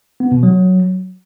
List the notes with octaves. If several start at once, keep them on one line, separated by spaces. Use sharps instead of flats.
B3
B2
F#3